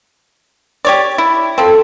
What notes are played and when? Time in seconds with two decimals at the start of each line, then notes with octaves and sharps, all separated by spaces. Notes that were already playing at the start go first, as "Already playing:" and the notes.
0.85 G4 C#5 D5
1.18 E4
1.58 F3 C4 A4 A5